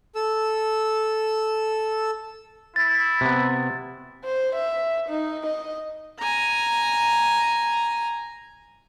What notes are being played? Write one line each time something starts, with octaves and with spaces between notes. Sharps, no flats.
A4 E6
E4 A6
C3 B3
C5
E5
D#4
D#5
G#5 A#5